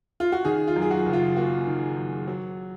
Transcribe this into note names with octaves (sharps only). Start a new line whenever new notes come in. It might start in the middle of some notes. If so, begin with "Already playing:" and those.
F4
F#4
D#3 G#4
F4
F#2
G#4
F#4
F#1
F4
A#3 F#4
D#3
F#2
F#3